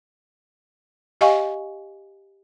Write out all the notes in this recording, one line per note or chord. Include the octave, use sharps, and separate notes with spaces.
G4 D#5 F5 G#5 C#6